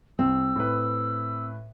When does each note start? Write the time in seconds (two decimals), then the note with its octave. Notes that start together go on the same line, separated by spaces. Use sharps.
0.19 C2 C4 E6
0.56 A2 B4